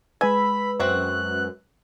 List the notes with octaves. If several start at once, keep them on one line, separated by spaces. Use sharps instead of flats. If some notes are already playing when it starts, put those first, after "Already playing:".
G#3 B4 G#5 B5 E6
F#2 C4 F#4 E5 F#6